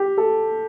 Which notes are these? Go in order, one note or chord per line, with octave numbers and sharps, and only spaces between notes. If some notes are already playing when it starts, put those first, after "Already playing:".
Already playing: G4
A4